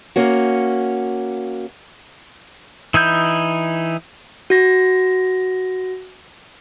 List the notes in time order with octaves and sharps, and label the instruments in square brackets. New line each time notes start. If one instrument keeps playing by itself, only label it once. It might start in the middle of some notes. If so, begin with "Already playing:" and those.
[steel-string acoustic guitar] A#3 C#4 F#4
[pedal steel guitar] E3 D#4 E4 G6
[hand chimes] F#4 A#6